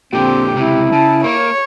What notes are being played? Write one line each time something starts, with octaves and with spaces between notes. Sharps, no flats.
A#2 D3 C4 G4
C#2 C3 E4
C#3 A5
A#3 C#5